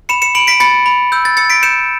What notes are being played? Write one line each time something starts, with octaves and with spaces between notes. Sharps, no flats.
B5 C#7 E7
C#7 E7
B5 D7 F#7
B6 D7
B5 A6 C#7
B5
E6 G6
A6
E6 A6 C#7
B6 D7
G6 C#7 E7